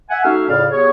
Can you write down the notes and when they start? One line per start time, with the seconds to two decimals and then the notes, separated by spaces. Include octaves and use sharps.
0.10 E5 F#5 G#5
0.24 A3 C#4 D#4 F#4 E5 F5
0.48 F2 A2 C#3 D5 F5
0.72 G3 B3 G#4 C#5